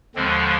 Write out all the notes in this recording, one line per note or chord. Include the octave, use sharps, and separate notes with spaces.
D#2 D3 F3 G#3 C4